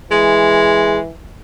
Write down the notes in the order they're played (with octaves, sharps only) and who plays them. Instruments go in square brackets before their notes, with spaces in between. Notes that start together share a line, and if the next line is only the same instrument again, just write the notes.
[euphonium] E3 [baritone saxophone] G#3